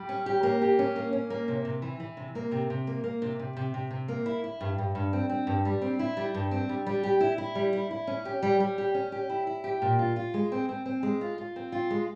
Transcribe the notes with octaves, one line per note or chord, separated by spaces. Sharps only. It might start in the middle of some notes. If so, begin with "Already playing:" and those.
Already playing: G3
C#4
G4
A#3
G4
C#4
A#3
C#4
A#3
C3
C3
E3
E3
C3
A#3
C3
C3
A#3
A#3
C3
C3
C3
C3
C3
A#3
E4
E4
G2
G2
G2
C4
C4
G2
G3
C4
E4
G3
G2
C4
G3
G3
G4
E4
E4
G3
E4
E4
C#4
G4
G3
G3
G4
C#4
G4
E4
E4
G4
A#2
F4
F4
G#3
C4
C4
C4
G#3
F4
F4
C4
F4
G#3